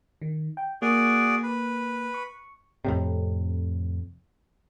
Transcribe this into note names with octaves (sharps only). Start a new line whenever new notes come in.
D#3
G5
A#3 F#4 G#4 D5
B4
C#6
F2 A2 C3